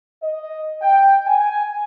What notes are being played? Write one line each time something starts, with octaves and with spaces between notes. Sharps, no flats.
D#5
G5
G#5